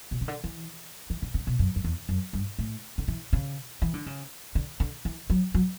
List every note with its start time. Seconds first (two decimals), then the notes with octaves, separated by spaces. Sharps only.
0.11 B2
0.21 C#3
0.28 D3
0.44 E3
1.10 E3
1.22 D3
1.34 C#3
1.47 B2
1.59 F#2
1.76 F#2
1.84 E2
2.09 F#2
2.33 G2
2.59 A2
2.98 D3
3.08 E3
3.33 C#3
3.82 E3
3.93 D3
4.06 C#3
4.55 D3
4.80 D3
5.05 E3
5.30 F#3
5.54 F#3